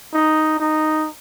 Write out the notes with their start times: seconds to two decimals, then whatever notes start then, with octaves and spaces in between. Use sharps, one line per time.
0.14 D#4
0.60 D#4